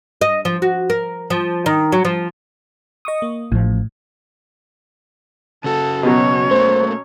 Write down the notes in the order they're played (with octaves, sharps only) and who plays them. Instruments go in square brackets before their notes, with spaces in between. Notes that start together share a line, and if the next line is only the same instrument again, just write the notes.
[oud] D#5
F3
F#4
A#4
F3
D#3
F#3
F3
[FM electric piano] D#5 C#6 D#6
A#3
[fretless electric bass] A1 F3 [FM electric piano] A2
[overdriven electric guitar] C#3 F#4 [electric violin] A4
[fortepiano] B2 F#3 [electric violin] C#4 C#5
[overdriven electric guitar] A3 A#3 [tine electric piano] C5